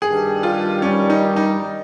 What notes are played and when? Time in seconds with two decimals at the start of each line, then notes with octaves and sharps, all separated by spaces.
0.02 G2 D#3 G3 G#4
0.43 F4
0.82 G2 D#3 G3 C#4
1.10 D#4
1.36 D#4